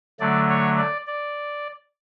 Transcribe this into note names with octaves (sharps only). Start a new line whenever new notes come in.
D3 F#3 A3 D5
C#5
D5
D5